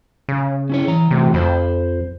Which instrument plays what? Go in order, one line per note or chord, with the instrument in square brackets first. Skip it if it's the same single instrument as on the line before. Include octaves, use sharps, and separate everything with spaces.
[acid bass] C#3
[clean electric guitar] C#4 E4 C#5
E3 A#5
[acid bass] C3 [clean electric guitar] E3 A3 F#4
[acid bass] F2 [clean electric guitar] C5 B5